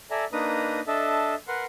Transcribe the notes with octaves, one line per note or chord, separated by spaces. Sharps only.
A4 D5 E5 G#5 A#5
A#3 D4 D#4 B4 A#5 D#6
D4 A4 D#5 E5 A5
A#4 B4 F#5 C6